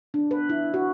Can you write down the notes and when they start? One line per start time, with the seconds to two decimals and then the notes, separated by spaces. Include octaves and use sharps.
0.14 D4
0.31 B4
0.49 E4
0.74 F#4